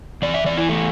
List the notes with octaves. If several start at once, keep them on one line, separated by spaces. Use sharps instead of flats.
E2 E3 D5
E5
D5
E4
A3